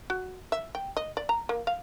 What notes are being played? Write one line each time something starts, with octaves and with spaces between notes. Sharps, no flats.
F#4
E5
G5
D#5
D5
A#5
A#3
F5